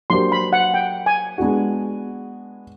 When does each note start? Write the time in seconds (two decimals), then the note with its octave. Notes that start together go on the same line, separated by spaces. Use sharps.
0.10 F#3 A#3 D4 G4 C5 C6
0.32 B5
0.53 F#5
0.74 G5
1.06 G#5
1.38 G#3 B3 D4 F#4